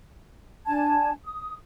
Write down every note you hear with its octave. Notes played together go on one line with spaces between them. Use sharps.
D4 G#5 A5 G#6
D#6